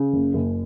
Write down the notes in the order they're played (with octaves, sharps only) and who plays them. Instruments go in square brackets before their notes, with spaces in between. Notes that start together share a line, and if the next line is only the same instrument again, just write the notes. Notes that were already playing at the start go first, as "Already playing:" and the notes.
Already playing: [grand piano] C#3
F#1
F#1